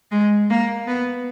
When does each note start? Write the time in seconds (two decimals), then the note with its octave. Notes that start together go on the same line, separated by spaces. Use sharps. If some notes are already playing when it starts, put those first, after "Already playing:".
0.12 G#3
0.50 A#3
0.87 B3